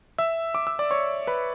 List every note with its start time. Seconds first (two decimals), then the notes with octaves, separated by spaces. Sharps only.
0.18 E5 E6
0.55 D6
0.67 E6
0.79 D5 D6
0.91 C#5 C#6
1.27 B4 B5